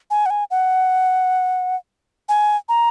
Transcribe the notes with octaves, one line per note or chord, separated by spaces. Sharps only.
G#5
F#5
G#5
F#5
G#5
A#5